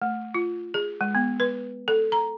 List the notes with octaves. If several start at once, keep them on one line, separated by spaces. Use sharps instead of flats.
A3
F4
G#4
G#3
B3
B4
A4
A#5